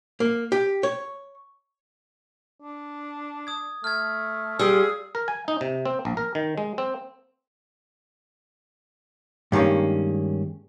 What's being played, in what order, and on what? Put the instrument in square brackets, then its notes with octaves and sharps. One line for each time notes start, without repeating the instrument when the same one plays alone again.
[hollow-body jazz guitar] A#3
G4
C#5
[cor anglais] D4
[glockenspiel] D#6 G#6
[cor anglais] A3 [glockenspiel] F6 G#6
[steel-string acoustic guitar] G3 [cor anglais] F4 [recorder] G#4 [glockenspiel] E6
[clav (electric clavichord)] A#4
G#5
D#4
C3
C4
A#1
A#4
D#3
G#3
C4
[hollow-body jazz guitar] G2 D#3 G#3 A#3 C#4